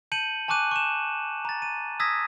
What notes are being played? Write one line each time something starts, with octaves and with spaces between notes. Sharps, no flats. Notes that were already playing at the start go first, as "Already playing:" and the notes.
A5 G6 C#7 D#7 F#7
G#5 A5 C#6 D6 F#6 D#7
C#6 E7
A#5 A6
D#7
D#6 E6 G#6 A#6 B6